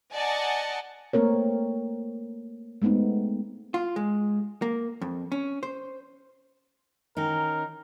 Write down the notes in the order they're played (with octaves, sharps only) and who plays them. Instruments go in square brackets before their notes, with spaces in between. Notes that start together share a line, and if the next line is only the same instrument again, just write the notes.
[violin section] D5 D#5 F#5 G#5 A5
[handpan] A3 A#3 C4 A#4 C#5
G#3 A3 B3 C4 D#4
[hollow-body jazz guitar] F4
G#3
A#3
F2
C#4
C5
[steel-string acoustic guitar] D#3 C#4 D#4 [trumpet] A#4